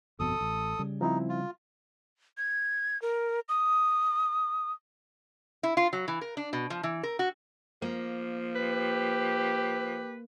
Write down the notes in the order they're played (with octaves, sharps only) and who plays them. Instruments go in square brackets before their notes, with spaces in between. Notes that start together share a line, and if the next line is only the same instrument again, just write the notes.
[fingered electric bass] G1 F2 B2 [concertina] A4 D#6
[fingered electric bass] A1
C#3 G3
[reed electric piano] F3 C4 E4 [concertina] D#4
[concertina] F4
[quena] G#6
A#4
D#6
[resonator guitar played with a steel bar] E4
F4
F#3
E3
A#4
D4
B2
F3
E3
A#4
F#4
[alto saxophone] F3 [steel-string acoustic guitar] A#3
[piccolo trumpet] G4 [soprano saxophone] B4